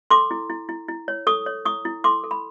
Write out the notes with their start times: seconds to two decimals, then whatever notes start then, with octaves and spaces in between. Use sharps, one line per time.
0.10 A4 C6 D6
0.31 E4
0.50 E4
0.69 E4
0.88 E4
1.08 C#5
1.27 A4 C#6 D#6
1.46 C#5
1.65 E4 C#6 D#6
1.85 E4
2.04 A4 C6 D6
2.24 A4
2.31 B5